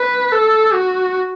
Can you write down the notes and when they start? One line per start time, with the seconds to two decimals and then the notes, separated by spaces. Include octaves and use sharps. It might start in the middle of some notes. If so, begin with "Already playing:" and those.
Already playing: B4
0.32 A4
0.73 F#4